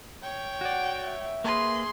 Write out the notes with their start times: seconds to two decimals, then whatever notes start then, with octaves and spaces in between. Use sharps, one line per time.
0.23 C#5 G5
0.61 F#4 D5 F#5
1.03 E5
1.44 A#3 G#4 A#4 B4 C6